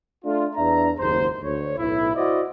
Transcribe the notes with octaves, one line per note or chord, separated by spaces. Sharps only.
A3 D4 F4
E2 D4 E5 A#5
F#1 D#2 G#2 C5
D2 C#5
B1 A2 E4
E4 F#4 C5 D5 D#5